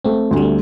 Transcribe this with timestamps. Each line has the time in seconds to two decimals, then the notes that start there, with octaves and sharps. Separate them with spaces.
0.04 A3 C4
0.31 D2
0.36 G3
0.42 A3